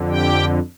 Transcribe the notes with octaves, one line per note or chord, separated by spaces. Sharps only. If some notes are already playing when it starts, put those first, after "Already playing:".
Already playing: F2 D3
G4 G5